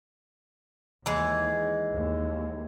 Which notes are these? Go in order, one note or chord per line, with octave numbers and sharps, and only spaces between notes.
D#2 E3 G#3
D#2